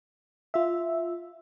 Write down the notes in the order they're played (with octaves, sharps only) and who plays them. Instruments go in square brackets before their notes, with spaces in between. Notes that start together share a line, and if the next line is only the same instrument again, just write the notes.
[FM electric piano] F4 E5